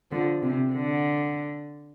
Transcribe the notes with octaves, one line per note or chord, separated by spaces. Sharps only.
D3 F3
C3
D3